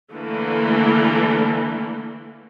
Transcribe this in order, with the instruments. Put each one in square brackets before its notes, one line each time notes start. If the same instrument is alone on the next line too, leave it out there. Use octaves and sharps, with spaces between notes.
[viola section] D3 E3 A3 A#3